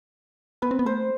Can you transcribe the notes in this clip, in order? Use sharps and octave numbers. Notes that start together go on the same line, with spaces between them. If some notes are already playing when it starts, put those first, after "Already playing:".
B3 B4
C4
B3
A3 C5